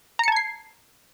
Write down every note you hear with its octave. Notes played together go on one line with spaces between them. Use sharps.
A5 A#5 G#6 C7 C#7